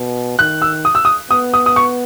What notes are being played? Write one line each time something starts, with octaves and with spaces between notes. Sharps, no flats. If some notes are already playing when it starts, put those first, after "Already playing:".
Already playing: B2
D#3 F#6
E6
D#6
E6
D#6
B3 D#6
D#6
D#6
C#6